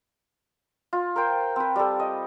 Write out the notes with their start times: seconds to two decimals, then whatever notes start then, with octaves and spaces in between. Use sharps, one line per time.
0.93 F4
1.16 A#4 C5 G5
1.56 C4 B4
1.76 G3 A4
2.00 D#5